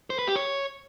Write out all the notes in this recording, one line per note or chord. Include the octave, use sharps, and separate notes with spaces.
C5
B4
G4
C#5